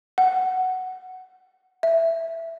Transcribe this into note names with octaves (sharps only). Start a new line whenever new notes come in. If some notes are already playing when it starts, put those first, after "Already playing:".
F#5
E5